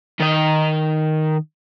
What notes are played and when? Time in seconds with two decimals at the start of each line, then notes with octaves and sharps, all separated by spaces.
0.20 D#3 D#5